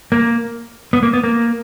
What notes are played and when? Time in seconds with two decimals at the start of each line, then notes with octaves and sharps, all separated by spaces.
0.12 A#3
0.93 B3
1.03 A#3
1.14 B3
1.24 A#3